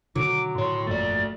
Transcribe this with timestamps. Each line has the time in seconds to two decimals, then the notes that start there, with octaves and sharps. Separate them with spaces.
0.15 B2 D3 D#3 F#3 D6
0.55 A2 C#5 C6
0.87 G1 F2 A#2 A3 D5 A6